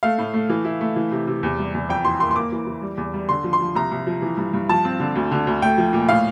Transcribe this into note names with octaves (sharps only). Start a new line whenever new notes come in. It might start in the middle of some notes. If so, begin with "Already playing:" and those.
A3 F5
A2
A3
E3
E4
A3
E3
C3
C3
E2
G3
E2
F2 G5
E3 C6
A#3 C6
C6
A#3 D6
E3
E3
G3
E2
G3
D3 C6
F3
C6
F3
C2 A#5
C2
F3
E3
G2
G2
F3 A5
C4
D3
D2
D3
D2
A3 G5
F3
A#2
A2 F5